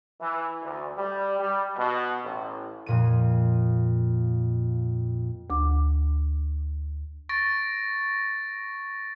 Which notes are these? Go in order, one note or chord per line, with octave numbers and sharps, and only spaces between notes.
E3
D2
G3
G3
B2
A1
F2 A#2 D#7
D2 D6
C#6 A6 A#6 D7